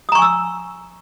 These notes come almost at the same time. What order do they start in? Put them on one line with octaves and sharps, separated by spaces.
D#6 A#5 C#6 G#5 E6